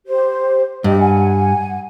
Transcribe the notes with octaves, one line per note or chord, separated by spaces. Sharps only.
G4 C5
G2 G4 D#5
F#5 G#5